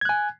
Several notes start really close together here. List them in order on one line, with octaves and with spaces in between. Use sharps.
G#6 F#6 G#5